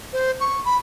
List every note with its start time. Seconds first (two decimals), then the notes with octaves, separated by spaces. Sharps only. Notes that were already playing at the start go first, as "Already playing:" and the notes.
0.13 C5
0.40 C#6
0.65 B5